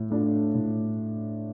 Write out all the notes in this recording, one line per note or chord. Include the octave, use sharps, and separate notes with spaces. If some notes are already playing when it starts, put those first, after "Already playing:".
Already playing: A2
A3 D4 F4
A2